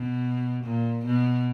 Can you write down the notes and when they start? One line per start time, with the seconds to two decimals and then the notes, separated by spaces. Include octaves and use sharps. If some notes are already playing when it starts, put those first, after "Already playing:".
Already playing: B2
0.63 A#2
1.05 B2